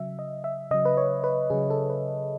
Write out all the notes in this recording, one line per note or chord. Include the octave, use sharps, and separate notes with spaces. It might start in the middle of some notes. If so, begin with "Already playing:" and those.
Already playing: C#3 F#3 E5
D#5
E5
C#3 F#3 D#5
B4
C#5
B4
C#3 F#3 G#4
A4
B4